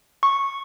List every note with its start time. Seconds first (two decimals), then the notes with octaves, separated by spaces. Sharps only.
0.23 C#6